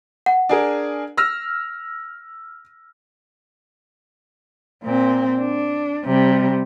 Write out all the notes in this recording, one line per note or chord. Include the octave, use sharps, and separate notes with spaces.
F#5
D4 G#4 A#4
E6 F6 A#6
A#2 C4
D4
C3 G3